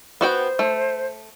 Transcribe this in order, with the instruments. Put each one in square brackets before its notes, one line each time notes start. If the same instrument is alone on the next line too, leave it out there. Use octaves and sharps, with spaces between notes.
[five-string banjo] B3 F#4 G5 [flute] C5
[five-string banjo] A3